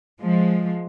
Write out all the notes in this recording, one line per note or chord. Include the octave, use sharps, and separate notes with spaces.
F3 G#3